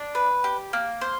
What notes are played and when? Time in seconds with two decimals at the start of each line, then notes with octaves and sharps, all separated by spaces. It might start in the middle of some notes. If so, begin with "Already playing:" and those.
Already playing: D4
0.15 B4
0.44 G4
0.73 A#3
1.01 C5